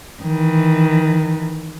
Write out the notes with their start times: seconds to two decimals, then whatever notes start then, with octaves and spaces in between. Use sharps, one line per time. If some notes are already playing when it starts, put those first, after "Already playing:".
0.22 D#3 E3